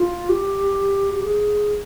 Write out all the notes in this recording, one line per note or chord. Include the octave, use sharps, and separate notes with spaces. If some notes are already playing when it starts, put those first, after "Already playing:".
Already playing: F4
G4
G4
G#4